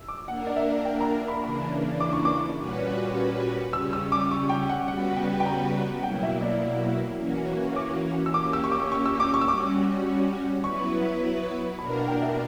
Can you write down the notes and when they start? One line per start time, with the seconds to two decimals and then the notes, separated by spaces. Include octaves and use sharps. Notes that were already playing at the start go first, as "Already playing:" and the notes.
Already playing: E6
0.08 D6
0.28 A#3 D4 A#4 F#5
0.47 D5
0.56 E5
0.85 G5
1.01 A#5
1.28 B5
1.43 C#3 E3 A#3 D4 B5
2.00 D6
2.13 C#6
2.25 D6
2.58 A#2 G3 C#4 F#4 B4
3.73 C#3 G3 C#4 E6
3.93 E6
4.12 D6
4.31 C#6
4.49 G5
4.69 F#5
4.88 C#3 G3 B3 F#4 B4 F#5
5.16 G5
5.40 G5
5.46 A#5
5.99 F#5
6.03 B2 F#3 A#3 E4 G5
6.23 E5
6.42 D5
7.19 E3 A#3 C#4 F#4
7.76 D6
8.26 E6
8.34 A#3 C#4 G4 D6
8.53 E6
8.64 C#6
8.72 D6
8.92 C#6
9.06 E6
9.20 D6
9.34 C#6
9.41 E6
9.48 G3 C#4 F#4 D6
10.64 F#3 B3 E4 B4 C#6
11.79 B2 A#3 D4 A#4 B5
11.99 F#5
12.08 G5
12.22 E5